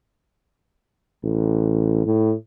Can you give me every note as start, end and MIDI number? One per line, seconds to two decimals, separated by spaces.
1.24 2.03 33
2.05 2.34 45